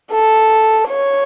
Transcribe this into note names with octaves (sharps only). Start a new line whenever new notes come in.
A4
C#5